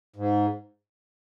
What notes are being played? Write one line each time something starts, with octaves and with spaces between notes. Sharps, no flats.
G#2